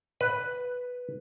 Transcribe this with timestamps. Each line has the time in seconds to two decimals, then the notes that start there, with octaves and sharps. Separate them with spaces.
0.21 B4